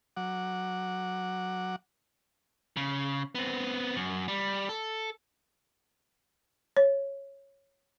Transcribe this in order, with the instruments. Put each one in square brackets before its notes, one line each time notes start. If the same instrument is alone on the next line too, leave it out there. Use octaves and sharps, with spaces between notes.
[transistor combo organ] F#3 F#5 D6
[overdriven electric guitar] C#3
B3 C4
F#2
G3
A4
[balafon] C#5